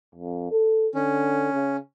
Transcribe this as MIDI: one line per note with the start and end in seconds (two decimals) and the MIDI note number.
0.15 0.51 41
0.51 0.87 69
0.95 1.53 50
0.95 1.77 61
1.53 1.78 49